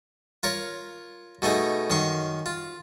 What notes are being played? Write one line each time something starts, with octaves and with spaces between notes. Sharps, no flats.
F4 A#4 C#5
B2 A3 D#4 G#4
F#2 D#3 C6 C#6
F4